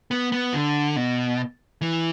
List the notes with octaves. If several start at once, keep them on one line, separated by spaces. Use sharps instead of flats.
B3
B3
D3
B2
E3